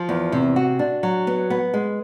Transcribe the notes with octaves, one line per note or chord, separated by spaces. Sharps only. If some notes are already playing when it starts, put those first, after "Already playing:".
Already playing: F3
E2
C3
F#4
D4
F#3
B3
B3
G#3